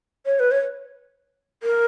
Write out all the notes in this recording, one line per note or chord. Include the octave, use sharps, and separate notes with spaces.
C#5
B4
C#5
A#4